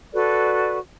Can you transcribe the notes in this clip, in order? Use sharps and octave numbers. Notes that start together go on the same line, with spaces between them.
F#4 A4 B4 D5